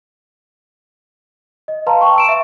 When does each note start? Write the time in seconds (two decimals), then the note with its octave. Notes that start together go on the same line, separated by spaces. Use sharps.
1.68 D#5
1.87 B4 F5 A5 A#5 C6
2.01 G5 A5 C#6
2.16 E6 D7 E7
2.29 E5